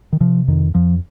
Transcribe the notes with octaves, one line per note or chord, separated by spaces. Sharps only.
D#3
C3 F3
F2 D#3
F2 F3